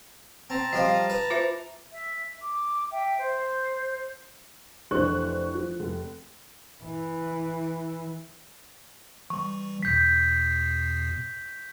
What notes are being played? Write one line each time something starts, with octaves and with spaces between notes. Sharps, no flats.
C4 A5 A#5
F3 G3 F4 D#5
B4
F4 C5 E5
E5
D6
E5 G5
C5
F1 E3 D4 C5 C#6 F#6
F3
F1
E3
E3 G3 C#6
E2 B2 G6 B6 C7